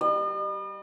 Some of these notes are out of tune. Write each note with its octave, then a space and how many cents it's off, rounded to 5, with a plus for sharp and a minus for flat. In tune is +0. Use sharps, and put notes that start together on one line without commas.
G3 -10 D#5 -45